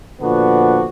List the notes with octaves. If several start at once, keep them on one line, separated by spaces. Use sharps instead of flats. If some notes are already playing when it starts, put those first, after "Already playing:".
A#2 D3 F3 B3 D4 F#4